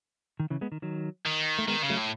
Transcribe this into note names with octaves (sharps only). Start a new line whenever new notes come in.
D#3
C#3 E3
G#3 B3
D#3
D#3 F#3
D#3
A3
D#3 G#3 B3
C#3
F#3 A3
A2